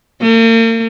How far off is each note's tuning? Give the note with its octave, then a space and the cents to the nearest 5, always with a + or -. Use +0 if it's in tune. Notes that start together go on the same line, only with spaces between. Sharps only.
A#3 -45